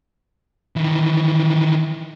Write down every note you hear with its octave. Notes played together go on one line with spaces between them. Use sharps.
D#3 E3